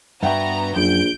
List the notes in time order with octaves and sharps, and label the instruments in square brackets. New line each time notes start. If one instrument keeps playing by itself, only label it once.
[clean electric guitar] G2 D4 F#4 [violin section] B3 A#5 [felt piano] E5 F#5 G5
[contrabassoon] A#1 [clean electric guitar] F#2 [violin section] G6 D7